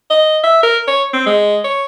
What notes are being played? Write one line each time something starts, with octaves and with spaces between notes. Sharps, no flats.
D#5
E5
A#4
C#5
C4
G#3
C#5